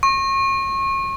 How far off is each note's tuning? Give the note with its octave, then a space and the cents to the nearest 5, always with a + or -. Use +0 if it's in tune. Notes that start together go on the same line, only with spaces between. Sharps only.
C#6 -35